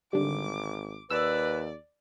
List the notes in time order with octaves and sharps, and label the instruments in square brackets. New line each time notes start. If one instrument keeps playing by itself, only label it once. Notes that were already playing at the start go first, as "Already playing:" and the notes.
[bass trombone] G#1 [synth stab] D3 G3 [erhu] D6
[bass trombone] D#2 [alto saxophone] B4 [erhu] D5 [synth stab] E6